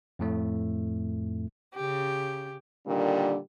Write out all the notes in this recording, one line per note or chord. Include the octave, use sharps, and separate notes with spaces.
F2 A2 A3
C#3 G4
A#2 D3 D#3 G3